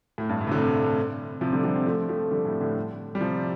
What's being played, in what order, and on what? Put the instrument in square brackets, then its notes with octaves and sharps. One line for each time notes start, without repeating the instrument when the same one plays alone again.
[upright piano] A2
G2
A2
C3
A2 D3
C3 F3
D3 G3
D3 G3
C4
F3 A3
F3 A3
D3 G3
A2
A2 D3
G3
C3 F3